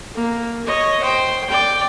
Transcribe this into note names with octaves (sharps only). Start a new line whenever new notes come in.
A#3
C#5 D#5
C5 G5
D5 G5